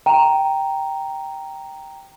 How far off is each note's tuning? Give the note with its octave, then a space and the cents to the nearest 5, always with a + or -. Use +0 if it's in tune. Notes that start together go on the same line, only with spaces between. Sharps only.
G5 +0 A#5 +0